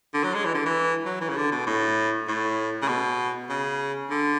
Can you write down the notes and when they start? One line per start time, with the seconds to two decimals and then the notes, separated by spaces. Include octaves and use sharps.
0.14 D3
0.24 F#3
0.34 G#3
0.45 E3
0.55 D3
0.66 E3
1.06 F#3
1.21 E3
1.29 C#3
1.36 D3
1.52 B2
1.67 A2
2.28 A2
2.82 C#3
2.88 B2
3.50 C#3
4.11 D3